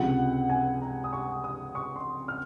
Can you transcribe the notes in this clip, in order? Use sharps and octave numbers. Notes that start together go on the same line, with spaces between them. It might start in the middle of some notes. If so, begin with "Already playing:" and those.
Already playing: C#2 C3 F3 F#5
G#5
A#5
D#6
C#6
D#6
C#6
C6
F6